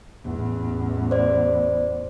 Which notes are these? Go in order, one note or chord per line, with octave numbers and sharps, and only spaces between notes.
A1 E2
C5 D5